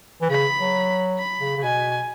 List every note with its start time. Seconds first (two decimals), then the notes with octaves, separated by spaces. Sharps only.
0.22 E3
0.30 C#3 B5
0.59 F#3
1.19 B5
1.40 C#3
1.57 C#3
1.63 B2 G#5